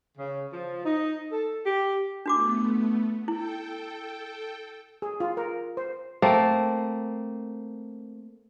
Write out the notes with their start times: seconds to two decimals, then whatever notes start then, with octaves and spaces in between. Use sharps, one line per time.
0.18 C#3
0.53 F3
0.85 D#4
1.32 A4
1.65 G4
2.26 A3 B3 D4 F#4 D6
3.28 E4 A4 G5
5.02 G#4
5.20 F4
5.37 A#4
5.77 C5
6.22 A3 A#3 C4